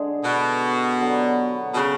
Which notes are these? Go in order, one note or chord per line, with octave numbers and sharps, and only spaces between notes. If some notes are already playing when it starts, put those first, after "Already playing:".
Already playing: D3 G#3 D4 G#4
B2
D3 F#3 B3
B2
C#3